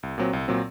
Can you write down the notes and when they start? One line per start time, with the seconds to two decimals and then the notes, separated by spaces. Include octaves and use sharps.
0.03 C2
0.18 A#2 F#3 C4
0.33 C2
0.48 A#2 F#3 C4